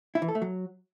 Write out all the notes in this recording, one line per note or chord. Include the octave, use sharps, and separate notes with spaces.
E4
E3
A4
A3
F#3